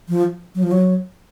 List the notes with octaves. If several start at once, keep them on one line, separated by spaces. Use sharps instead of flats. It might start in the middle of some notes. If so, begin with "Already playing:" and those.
F3
F#3
F3
F#3